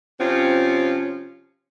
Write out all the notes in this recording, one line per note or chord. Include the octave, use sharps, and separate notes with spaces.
C3 F3 C4 C#4 F4